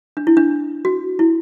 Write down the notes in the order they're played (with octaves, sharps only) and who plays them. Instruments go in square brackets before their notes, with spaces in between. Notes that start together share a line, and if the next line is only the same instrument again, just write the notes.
[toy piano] D4
E4
D4
F#4
E4